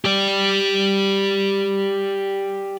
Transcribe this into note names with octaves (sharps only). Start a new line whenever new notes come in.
G4 D5